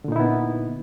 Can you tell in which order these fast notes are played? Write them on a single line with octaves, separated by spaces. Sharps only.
D3 A#2 D#4 E4 B3